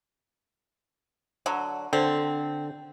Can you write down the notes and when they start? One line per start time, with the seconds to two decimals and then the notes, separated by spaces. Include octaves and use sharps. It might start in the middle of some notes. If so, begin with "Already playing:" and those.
1.46 D3 F#3
1.93 D3 C4